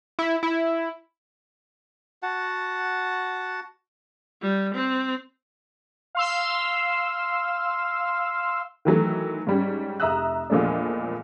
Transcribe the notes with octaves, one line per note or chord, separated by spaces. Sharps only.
E4
E4
F#4 F#5 A5
G3
C4
F5 C6 E6
D#3 E3 F#3 A3
G#2 G3 C#4
F1 E5 A#5 D#6 E6 F#6
E2 A#2 F3 G#3 A3 D4